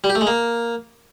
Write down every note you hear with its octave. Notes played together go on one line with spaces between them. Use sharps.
G3
G4
A3
G#3
A#3